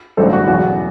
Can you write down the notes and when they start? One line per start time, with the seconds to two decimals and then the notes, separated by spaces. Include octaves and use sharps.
0.17 A1 G2 D3 F#3 A4 C5
0.33 F#4
0.48 E2 B2 F#3 F#4